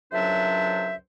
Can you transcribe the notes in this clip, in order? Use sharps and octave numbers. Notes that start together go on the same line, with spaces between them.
C#2 F#2 F#3 D4 C5 E5